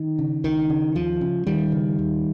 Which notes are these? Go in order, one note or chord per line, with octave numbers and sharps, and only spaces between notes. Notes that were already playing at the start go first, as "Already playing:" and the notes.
Already playing: D#3
C#3
C#2 D#3
C#3
D#2 F3
C#3
D#2 D#3 G3
C#3
D#2